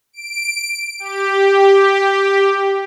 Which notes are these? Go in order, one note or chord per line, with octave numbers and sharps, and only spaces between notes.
D7
G4